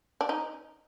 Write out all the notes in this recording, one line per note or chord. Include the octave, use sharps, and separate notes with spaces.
D4
D#4